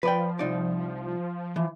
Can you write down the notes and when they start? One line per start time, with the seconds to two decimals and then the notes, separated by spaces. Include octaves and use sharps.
0.03 F3 B4 D5 G5
0.39 C2 D#4 D5
1.56 E3